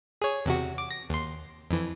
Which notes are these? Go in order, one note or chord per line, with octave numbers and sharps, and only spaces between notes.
G#4 C#5
E2 C3 F#4
D6
A#6
D#2 C6
F2 E3